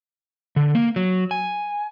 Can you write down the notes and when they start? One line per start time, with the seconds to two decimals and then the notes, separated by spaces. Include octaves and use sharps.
0.56 D3
0.75 A#3
0.96 F#3
1.31 G#5